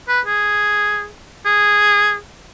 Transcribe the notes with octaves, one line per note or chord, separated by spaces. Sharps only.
B4
G#4
G#4